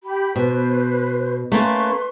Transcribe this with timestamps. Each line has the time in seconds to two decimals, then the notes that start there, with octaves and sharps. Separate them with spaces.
0.04 G4 B5
0.36 B2 B4 C5
1.52 A3 A#3 C#4 B4 C6 C#6